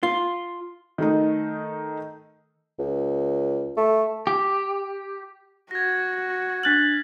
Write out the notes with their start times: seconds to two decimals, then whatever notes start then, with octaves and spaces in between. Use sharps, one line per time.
0.03 F4
0.98 D#3 A3 D#4
2.79 C#2
3.77 A3
4.27 G4
5.71 F#4 G#6 A#6
6.63 D4 F6 F#6 A6 B6 F#7